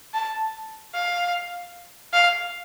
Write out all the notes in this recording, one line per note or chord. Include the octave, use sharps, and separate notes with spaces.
A5
F5
F5